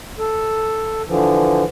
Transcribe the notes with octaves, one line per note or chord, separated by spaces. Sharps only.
A4
D3 E3 F3